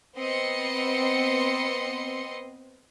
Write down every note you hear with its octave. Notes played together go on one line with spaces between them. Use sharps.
B3 C4 D#5 C6 C#7